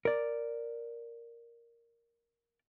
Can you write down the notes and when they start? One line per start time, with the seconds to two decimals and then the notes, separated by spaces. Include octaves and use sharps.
0.05 A#4 D5